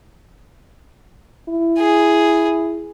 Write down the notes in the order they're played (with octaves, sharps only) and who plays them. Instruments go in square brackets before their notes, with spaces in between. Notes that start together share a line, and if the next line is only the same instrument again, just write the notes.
[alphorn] E4
[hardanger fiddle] G#4